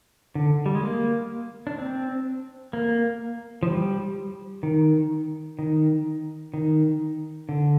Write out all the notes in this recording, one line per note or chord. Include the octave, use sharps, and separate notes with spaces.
D3
G3
G#3
A#3
D4
C4
A#3
F3
G3
D#3
D#3
D#3
D3